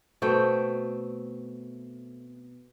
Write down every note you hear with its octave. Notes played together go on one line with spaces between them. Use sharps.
B2 A3 C4 G5